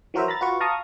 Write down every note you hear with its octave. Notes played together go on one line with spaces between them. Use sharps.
E3 F#3 F#4 A#4 C5 E5
A#5 B5 A6
F4 F#4 B4 C#6
F5 A5 A#5 C#6 D#6